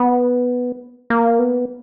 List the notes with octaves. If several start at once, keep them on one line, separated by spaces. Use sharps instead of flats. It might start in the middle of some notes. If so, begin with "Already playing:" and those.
Already playing: B3
A#3
B3